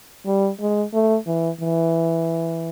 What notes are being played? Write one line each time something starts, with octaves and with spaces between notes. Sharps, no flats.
G3
G#3
A3
E3
E3